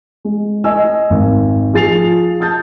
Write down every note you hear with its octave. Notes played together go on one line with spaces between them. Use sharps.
G#3
D#5 G#5 E6
G#1
F3 G#4 A6 C7 F7
A5 D#6 G6 A6